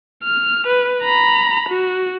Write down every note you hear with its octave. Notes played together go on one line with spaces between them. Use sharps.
F6
B4
A#5 B5
F#4